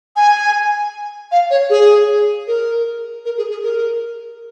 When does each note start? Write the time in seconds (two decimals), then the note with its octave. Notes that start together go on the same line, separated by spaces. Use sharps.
0.15 G#5
1.31 F5
1.50 C#5
1.69 G#4
2.47 A#4
3.24 A#4
3.37 G#4
3.50 G#4
3.62 A#4